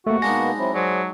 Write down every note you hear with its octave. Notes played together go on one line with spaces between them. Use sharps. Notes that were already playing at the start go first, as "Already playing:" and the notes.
C3 A3 A#3 F#4
B2 G#3 A#3 B3 D4 D#4 A#6
F#3 C4 E4
F#3 G#4 C5 D5